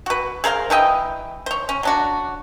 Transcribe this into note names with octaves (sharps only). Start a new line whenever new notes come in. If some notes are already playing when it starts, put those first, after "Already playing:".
F#4 B4
G#4 A#4 C5 F5
E3 A3 D#5 G5
C5 C#5
C#4
F#3 D4 F#4